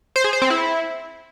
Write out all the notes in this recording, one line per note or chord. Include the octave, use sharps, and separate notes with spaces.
C5
G#4
C5
C4
E4